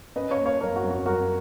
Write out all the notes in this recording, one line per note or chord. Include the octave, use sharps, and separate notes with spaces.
C#4 B4 D#5
C#5 F5
A#3
C#5 F5
F#2 A#4 C#5
F#4
F#2
F#4
F#2 F#4 A#4